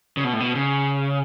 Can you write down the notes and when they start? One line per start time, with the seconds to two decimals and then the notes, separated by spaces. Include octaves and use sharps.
0.17 C#3
0.24 B2
0.33 A2
0.40 B2
0.55 C#3